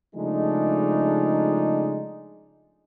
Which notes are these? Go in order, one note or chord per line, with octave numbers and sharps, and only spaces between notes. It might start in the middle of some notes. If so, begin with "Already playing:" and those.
C#3 F3 G#3 A3 D4 D#4